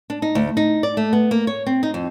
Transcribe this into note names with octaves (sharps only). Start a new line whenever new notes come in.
D4
D#4
D2
D#4
D5
A3
B3
A#3
C#5
C4
D#4
F2